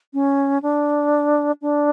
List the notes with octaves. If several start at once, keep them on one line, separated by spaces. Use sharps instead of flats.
C#4
D4
D4